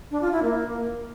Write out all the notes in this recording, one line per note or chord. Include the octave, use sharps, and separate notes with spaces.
D4
F4
E4
A#3